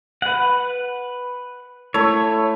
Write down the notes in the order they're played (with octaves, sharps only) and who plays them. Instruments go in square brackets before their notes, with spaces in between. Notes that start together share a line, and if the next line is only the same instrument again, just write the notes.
[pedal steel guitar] B4 F#5
[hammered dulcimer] A3 E4 [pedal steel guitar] C#5